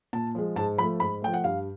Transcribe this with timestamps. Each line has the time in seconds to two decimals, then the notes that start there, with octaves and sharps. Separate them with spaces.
0.13 A#2 A5
0.35 F3 G#3
0.56 G#2 A5
0.78 F3 B5
0.82 A3
1.00 G#2 B5
1.22 F3 A3 G5
1.34 F#5
1.44 G2 F5